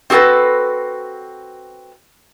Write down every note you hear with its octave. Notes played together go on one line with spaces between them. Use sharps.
C4 F#4 G#4 A4 B4